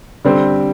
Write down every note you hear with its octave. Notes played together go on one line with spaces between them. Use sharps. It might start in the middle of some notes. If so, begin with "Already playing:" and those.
D3 G3 C4